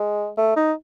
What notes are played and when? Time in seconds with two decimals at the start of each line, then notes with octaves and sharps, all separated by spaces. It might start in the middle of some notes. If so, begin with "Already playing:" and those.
Already playing: G#3
0.37 A3
0.56 D#4